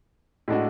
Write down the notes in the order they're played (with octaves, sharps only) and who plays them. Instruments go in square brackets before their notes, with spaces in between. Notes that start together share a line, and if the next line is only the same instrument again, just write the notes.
[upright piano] A2 G#3 D4 F#4